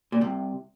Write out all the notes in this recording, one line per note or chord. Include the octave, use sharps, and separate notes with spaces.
A#2
C2 C3